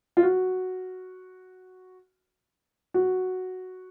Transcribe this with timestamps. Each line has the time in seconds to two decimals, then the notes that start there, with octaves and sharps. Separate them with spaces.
0.17 F4
0.23 F#4
2.94 F#4